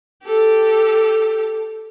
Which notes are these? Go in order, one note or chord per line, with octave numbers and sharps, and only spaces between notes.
G4 A4